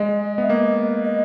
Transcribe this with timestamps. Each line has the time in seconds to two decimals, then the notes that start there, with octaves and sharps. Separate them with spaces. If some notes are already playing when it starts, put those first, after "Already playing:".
Already playing: G#3 D#5
0.38 B3 E5
0.49 A#3 D#5
1.04 D#5